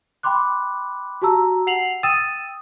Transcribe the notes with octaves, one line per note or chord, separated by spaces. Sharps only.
G5 B5 C6 D6 F#6
F#4 G4 A5 A#5 E6
F#5 C7 F7 F#7
G5 D#6 E6 A6 D#7 E7